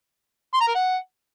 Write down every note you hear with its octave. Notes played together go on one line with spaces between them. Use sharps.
C6
A#5
A#4
F#5